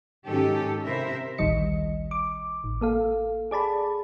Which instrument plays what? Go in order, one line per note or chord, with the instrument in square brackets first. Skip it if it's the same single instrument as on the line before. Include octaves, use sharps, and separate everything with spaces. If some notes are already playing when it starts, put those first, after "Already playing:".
[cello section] G#2 D#3 C#4 G4 A4
C3 E4 A#4 C5 E5
[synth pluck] A1 D2 D#3 G3 D#5 C#7
D6
A1
A#3 A4 F5
G#4 D5 A5 B5